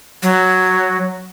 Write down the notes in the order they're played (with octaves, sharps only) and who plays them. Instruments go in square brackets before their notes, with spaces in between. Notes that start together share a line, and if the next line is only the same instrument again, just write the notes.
[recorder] F#3